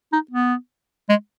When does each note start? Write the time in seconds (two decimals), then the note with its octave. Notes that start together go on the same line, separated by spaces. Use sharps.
0.13 D#4
0.31 B3
1.09 G#3